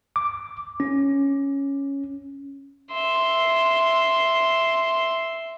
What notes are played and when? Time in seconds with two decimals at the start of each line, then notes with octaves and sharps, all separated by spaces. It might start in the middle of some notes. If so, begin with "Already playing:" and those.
0.16 D6
0.80 C#4
2.92 E5 C6